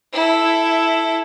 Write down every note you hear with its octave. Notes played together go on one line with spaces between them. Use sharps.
E4 A4